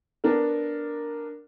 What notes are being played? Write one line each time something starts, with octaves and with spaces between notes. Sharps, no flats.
B3 D4 A#4